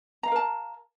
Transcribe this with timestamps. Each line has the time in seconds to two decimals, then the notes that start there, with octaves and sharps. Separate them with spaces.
0.23 A#5
0.28 F5
0.32 A#4
0.36 A5